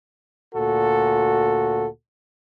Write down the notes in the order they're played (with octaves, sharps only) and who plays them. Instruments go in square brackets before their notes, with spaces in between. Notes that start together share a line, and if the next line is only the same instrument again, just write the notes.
[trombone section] D2 A#2 F#4 A4